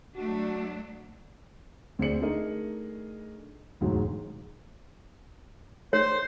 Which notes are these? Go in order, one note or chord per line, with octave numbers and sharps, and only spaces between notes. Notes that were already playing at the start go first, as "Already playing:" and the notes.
F#3 A3 D4 F#4
D2 C4 G#4 D5 C#7 F#7
A3 D4 D#4 G#4 A#4 D#5
E1 D2 G#2 D#3 F#3
C5 C#5